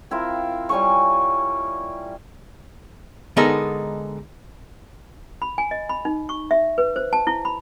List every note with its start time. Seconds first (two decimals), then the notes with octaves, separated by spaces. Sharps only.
0.11 C4 E4 F4 A#4
0.69 G3 C#5 G#5 C#6
3.37 D3 G#3 B3 D#4 A4 A#4
5.42 B5
5.58 G#5
5.71 D#5
5.89 B5
6.05 D#4
6.29 C#6
6.51 E5
6.78 B4
6.96 C5
7.13 A5
7.27 E4
7.45 B5